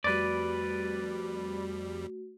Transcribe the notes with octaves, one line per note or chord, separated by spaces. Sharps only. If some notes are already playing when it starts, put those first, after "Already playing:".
F2 G3 A3 F#4 B4 D5